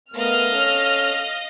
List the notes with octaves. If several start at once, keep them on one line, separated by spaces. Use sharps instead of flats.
A3 B3 A#4 D#5 F5 F6
C#4 A4